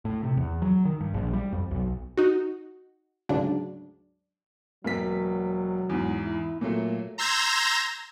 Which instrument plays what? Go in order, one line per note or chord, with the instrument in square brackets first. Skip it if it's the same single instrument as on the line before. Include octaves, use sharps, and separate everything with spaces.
[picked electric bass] A2
C3
E2
F#3
D#3
G2
A#1
G3
F2
B1
[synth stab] D#4 F#4
D2 G#2 C#3 F#3 D4
[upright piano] E1 A#3 B6 [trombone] F#3
[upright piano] E2 G#2
[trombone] E4
[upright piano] A#2 F#3 A3 [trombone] A#3
[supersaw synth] A#5 C6 E6 G6 G#6 A#6